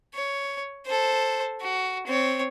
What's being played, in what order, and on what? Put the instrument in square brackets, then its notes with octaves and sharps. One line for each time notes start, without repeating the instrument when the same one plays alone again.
[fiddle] C#5
A4 C5
F#4
C4 C#5